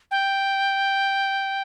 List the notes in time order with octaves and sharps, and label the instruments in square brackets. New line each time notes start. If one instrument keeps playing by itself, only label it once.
[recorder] G5